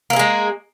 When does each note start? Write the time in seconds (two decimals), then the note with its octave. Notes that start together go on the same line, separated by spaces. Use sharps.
0.10 A#3
0.13 E4
0.16 G#4
0.19 G#3